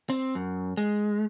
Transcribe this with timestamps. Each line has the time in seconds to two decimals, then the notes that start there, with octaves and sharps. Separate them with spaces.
0.10 C4
0.35 F#2
0.77 G#3